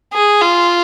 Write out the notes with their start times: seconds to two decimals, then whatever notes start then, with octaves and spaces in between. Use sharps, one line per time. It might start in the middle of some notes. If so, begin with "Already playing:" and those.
0.13 G#4
0.41 F4